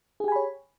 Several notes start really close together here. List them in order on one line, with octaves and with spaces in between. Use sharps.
G#4 G4 G#5 B5 C#5